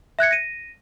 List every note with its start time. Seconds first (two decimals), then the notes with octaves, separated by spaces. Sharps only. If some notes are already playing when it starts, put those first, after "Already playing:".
0.19 E5 F#6 G#6 C#7
0.31 A#6 D#7